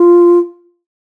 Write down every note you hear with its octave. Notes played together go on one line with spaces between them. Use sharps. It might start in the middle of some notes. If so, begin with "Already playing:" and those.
Already playing: F4